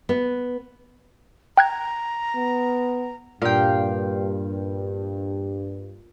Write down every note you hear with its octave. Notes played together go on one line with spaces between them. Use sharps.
B3
G5 A#5 F#6 G#6
B3
G2 A#2 F5 G5